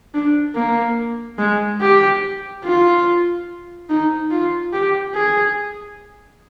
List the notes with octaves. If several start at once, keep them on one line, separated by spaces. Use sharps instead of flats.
D4
A#3
G#3
G4
F4
D#4
F4
G4
G#4